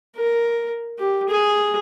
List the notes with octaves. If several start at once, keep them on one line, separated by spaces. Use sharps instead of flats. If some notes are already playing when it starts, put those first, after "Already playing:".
A#4
G4
G#4